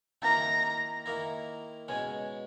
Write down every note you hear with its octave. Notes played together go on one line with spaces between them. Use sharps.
D#3 A#3 E4 A#5
D#3 A#3 E4
B2 G#3 C#4 G#5